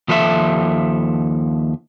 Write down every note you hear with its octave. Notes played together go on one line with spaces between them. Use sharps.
D#2 F3 A4 A#4 E5